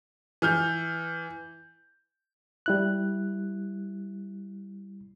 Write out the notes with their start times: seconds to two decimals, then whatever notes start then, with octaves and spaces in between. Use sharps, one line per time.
0.42 E3 F6 G6
2.66 G3 E4 F#6